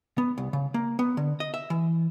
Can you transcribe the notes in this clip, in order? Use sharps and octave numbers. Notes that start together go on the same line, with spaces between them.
B3
C2
C#3
A#3
B3
D3
D#5
E5
E3